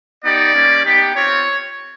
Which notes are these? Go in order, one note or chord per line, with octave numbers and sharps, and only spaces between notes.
B3 D#4 G4 D5
G3 A#3 C#4
B3 D#4 G4
C4 F4 C#5